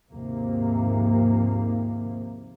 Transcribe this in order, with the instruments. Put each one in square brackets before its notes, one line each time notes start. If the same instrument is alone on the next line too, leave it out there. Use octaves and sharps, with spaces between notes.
[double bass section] D#2 G#2 C3 F3 A#3